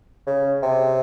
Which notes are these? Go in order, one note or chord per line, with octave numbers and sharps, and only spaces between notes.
C#3
C3